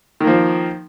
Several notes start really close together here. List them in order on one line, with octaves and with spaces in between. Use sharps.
D#3 A#3 F3